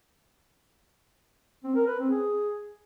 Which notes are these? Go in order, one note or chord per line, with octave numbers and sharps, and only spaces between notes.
C4
A#4
B4
C4
G#4